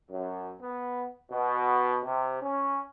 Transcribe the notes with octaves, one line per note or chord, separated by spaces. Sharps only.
F#2
B3
B2
C3
C#4